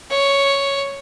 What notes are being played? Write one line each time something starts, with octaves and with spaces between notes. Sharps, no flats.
C#5